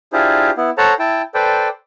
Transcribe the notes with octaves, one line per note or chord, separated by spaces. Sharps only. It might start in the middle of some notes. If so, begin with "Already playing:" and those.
D4 E4 F4 G4 G#4 C5
B3 E4
A4 C5 C#5 F#5 A5 A#5
E4 G5 A5
A4 B4 C5 D5 G5